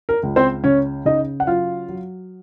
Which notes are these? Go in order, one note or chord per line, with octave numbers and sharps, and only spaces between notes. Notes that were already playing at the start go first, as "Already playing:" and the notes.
A#4
C#2
C4 C5
C#3 C#4 C#5
C#3 D#4 D#5
F#5
F#3 F4 F5
F#3